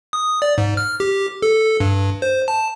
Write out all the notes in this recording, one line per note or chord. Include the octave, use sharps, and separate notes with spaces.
D#6
D5
G#2
F6
G4
A4
G2
C5
A5